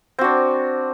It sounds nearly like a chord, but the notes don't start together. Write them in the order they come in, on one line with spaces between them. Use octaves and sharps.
C4 F#4 D4